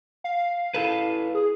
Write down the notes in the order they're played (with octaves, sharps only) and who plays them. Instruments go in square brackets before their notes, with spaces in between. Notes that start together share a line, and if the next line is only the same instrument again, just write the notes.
[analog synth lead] F5
[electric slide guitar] E4 A4 B4
[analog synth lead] G#4